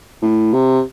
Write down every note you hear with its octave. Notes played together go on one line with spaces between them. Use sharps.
A2
C3